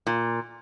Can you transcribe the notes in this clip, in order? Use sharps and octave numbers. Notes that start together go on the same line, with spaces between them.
A#2